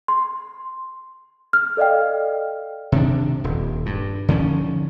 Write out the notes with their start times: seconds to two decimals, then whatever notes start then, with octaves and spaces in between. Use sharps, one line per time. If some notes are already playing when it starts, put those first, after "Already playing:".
0.08 C6
1.53 F6
1.77 A4 D5 D#5 F5 G5
2.92 C3 D#3 D4
3.44 D#1
3.86 G2
4.28 D3 D#3 F3 C#4